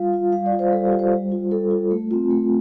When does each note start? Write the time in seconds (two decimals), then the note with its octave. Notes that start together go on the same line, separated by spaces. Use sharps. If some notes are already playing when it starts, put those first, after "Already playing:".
Already playing: G3 F4 F5
0.13 F4
0.32 G3 F5
0.46 D5
0.52 F4
0.59 C5
0.72 G3 A4
0.86 G4
0.92 F4
0.99 C5
1.12 G3
1.32 F4
1.51 G3 A4
1.71 F4
1.91 A3
2.11 C4 F4
2.31 A3